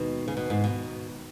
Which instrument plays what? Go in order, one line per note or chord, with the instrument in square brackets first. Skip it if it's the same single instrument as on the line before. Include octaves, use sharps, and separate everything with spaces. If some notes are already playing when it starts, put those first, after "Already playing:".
Already playing: [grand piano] D#2 D#3 G#3 D#4 B4 [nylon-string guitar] B2
[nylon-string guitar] C#3
B2
G#2
B2